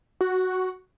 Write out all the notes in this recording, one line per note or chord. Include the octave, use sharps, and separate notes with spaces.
F#4